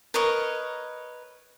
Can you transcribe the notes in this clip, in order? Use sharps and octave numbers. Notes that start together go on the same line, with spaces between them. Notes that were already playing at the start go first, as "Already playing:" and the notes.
A#4 B4 C#5 D#5